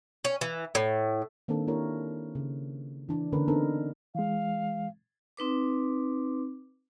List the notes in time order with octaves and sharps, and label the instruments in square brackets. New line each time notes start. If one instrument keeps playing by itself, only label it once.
[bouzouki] C#4
E3
A2
[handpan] D#3 A#3 C4 D4 A4
A#3 D4 E4 G4 A#4 C#5
C#3
E3 D4
D3 A#3 C#4 A#4 B4
B3 C4 D4 D#4 A4 A#4
[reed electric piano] E3 G#3 [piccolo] F5
[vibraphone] C4 D#4 B4 D6